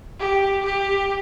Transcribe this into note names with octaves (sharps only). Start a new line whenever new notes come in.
G4
G4